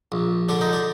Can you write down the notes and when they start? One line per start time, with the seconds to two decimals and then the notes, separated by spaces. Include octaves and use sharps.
0.12 A#1
0.49 D3 D4
0.61 D#4
0.73 D4